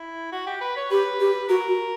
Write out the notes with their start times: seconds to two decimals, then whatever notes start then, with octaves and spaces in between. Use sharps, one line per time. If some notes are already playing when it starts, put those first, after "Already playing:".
Already playing: E4
0.32 F#4
0.46 G4
0.60 B4
0.76 C#5
0.91 G4 B4
1.20 G4
1.48 F#4 A#4
1.68 F#4